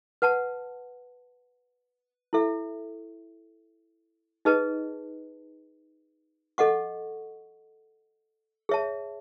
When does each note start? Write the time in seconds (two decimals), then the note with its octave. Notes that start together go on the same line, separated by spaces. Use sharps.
0.22 B4 F#5 A5
2.33 E4 A4 E5
4.45 D#4 G#4 B4 D#5 A5
6.58 A4 D#5 F#5 C#6
8.69 G#4 C#5 E5 A5